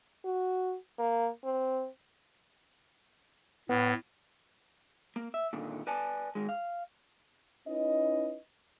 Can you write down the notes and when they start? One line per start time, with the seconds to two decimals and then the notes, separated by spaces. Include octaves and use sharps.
0.25 F#4
0.99 A#3
1.44 C4
3.69 A2 B3
5.16 A#3
5.34 E5
5.53 A#2 D3 D#3
5.87 B4 D5 G#5 A5
6.35 D#3 G#3
6.49 F5
7.67 C#4 D#4 E4 B4 D#5